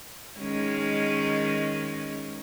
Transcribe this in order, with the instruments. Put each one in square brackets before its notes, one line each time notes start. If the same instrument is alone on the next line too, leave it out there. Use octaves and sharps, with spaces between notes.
[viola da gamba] D#3 G#3 C#4